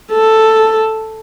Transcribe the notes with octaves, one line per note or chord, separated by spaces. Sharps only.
A4